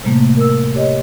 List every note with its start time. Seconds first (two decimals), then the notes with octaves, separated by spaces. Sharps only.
0.03 A2 C3 G3 A3 A#3
0.37 A#4 E6
0.74 G4 C#5 D#5